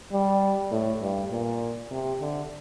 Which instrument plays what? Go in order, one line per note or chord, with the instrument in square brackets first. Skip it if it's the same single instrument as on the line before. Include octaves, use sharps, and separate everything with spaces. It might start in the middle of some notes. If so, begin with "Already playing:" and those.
[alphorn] G3
A2
G2
A#2
C3
D3